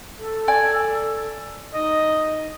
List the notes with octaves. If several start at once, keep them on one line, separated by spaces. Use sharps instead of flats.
A4
D5 G#5
D#4 D#5